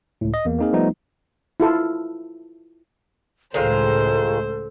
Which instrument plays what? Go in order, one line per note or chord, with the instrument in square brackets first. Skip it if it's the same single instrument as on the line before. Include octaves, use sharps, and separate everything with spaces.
[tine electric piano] C#2 A2
D#5
E2 A#3
A#3 C4 D#4 G#4 A#4
F3 G3 A3 B3 D#4
[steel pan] E4 F4 A4
[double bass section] C#2 A2 [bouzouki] D#3 G#3 F4 [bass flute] A4 [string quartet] C5